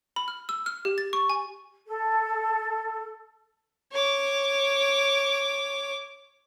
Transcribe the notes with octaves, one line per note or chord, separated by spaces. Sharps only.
B5
F6
E6
F6
G4
A6
C#6
G#5
A4
C#5 D6